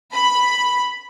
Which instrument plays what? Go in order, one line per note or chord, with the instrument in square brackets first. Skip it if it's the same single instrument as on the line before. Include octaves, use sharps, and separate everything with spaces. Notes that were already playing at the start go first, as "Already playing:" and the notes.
[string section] B5